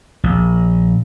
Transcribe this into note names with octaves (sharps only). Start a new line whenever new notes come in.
A#1